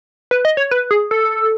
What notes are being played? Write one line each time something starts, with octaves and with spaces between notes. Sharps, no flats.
B4
D#5
C#5
B4
G#4
A4